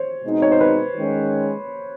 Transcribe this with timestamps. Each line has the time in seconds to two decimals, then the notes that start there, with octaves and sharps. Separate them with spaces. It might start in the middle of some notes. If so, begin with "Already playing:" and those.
Already playing: C5 C#5
0.24 B2 G#3 C4 D#4
0.42 C#5
0.52 C5
0.61 B4
0.96 D#3 G#3 C#4